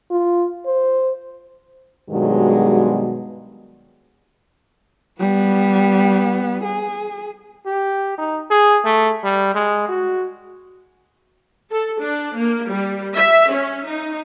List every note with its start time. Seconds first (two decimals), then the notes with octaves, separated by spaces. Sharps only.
0.11 F4
0.67 C5
2.10 G2 B2 D#3 F#3 G#3
5.20 G3 B3
6.64 G#4
7.66 G4
8.18 D#4
8.51 G#4
8.85 A3
9.23 G3
9.55 G#3
9.89 F#4
11.71 A4
12.01 D4
12.37 A#3
12.70 G3
13.14 E5
13.52 C#4
13.86 D#4